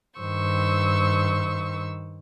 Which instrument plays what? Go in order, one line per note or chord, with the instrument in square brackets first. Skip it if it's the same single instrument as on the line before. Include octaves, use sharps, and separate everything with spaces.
[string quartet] G2 D#3 C5 C#6 E6